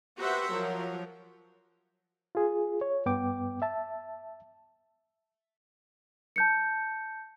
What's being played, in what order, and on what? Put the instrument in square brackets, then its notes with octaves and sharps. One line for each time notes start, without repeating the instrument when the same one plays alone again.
[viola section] F#4 G4 B4 C5 E5 F#5
F3 F#3 A#4
[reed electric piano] F4 G#4
C#5
G2 B3 G5 D6
E5 A5
[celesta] A5 G6 C#7